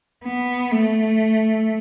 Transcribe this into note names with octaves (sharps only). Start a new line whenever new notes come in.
B3
A3